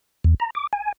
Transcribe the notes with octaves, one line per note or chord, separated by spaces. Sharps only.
E2
A#5
D6
G#5